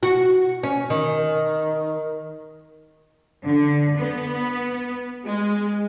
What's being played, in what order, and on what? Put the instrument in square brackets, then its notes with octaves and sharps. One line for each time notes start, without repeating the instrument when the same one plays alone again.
[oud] F#4
C#4
D#3
[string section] D3
B3
G#3